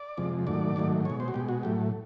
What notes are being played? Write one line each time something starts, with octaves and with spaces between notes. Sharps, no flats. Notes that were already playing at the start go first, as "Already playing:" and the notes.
Already playing: D5
F2 C3 F3 G#3
G#2 D#3 F#3 A3 D5
G#2 D#3 F#3 A3
B2 G#3 C#5
C5
F#4
B2 G#3 G4
F#4
A2 F#3 A3 G4